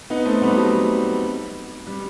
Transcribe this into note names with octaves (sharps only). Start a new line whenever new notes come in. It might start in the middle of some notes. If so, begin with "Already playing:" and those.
B3 D#4
A3 C4
G3 B3
F#3 A3
G3